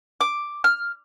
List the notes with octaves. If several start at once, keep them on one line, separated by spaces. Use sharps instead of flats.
D6
F6